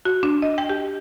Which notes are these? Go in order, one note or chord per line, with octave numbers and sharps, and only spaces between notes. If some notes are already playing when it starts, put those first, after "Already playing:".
F#4
D4
D#5
G5
G4